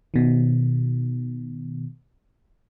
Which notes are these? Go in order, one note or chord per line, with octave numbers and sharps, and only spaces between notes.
B2 D#3